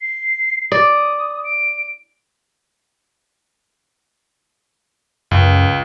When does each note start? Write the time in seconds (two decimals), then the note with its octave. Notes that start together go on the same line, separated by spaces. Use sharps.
0.01 C7
0.72 D5 D#6
1.44 D7
5.31 C#2 F#2